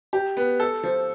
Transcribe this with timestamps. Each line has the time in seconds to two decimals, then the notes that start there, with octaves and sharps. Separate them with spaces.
0.13 G4
0.37 B3
0.60 A4
0.83 F3